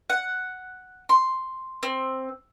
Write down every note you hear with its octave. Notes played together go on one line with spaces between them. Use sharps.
F#5
C6
C4